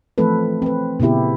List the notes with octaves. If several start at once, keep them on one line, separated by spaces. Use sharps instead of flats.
E3 F3 A3 C4 A4 B4
C4 B4
A#2 C#3 B3 E4 G4